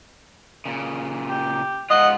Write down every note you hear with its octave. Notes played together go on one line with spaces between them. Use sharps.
A#2 C#3
G4
G#2 G#3 F4 D#5 F#5